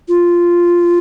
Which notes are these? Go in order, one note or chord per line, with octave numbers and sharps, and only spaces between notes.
F4